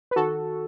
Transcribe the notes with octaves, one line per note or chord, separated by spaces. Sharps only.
B4
D#3 F#4 A4